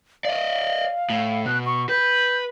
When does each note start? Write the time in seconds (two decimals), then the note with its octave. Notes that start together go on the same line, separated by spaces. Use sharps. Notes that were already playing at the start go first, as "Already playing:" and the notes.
0.25 D5 D#5 F5
1.10 A2
1.46 B2 F#6
1.66 C#6
1.89 B4 G6